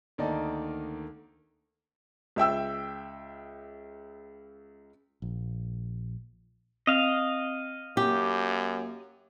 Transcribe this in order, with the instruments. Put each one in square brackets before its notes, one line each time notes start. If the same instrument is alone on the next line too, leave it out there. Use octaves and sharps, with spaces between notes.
[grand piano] D2 D#3 A#3 D5 D#5 A5
[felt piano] C#2 E5 G5 E6
[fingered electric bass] A#1
[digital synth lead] C4 [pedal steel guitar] D#5 F5
[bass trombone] F#2 [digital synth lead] A#3 [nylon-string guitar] G4